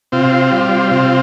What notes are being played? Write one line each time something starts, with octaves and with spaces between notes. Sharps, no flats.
C3 C4 F4
G3
C3